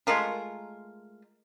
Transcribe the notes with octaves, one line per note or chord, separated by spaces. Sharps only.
G#3 A3 F4 A#4